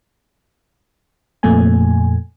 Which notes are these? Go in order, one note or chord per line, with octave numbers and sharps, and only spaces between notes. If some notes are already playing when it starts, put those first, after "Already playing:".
F2 A#2 A3 G#5